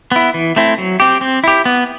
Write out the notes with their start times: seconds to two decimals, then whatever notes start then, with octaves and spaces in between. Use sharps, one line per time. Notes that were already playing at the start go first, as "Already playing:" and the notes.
0.12 B3 E4
0.34 E3
0.56 A3 C4 E4
0.78 F#3
1.00 C4 G4
1.21 C4
1.44 E4 G4
1.65 B3